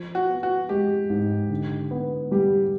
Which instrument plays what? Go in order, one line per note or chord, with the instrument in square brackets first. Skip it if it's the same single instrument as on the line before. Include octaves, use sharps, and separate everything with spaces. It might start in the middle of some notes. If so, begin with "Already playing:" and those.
Already playing: [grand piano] F3
[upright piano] F#4
[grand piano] B3
[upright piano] F#4
[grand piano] G#3 [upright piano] G4
[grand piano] G#2
D3
B3
[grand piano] G3 [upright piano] G4